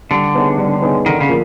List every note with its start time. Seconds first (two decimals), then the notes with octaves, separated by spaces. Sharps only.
0.11 D3 G3
0.35 B3 D#4 G#4 C#5
0.58 G3
0.82 B3 D#4 G#4 C#5
1.06 D3 D#3
1.21 C#3
1.29 F3 A#3